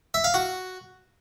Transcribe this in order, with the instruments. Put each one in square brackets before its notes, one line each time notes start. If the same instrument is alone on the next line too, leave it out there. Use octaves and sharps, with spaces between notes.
[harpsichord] E5
F5
F#4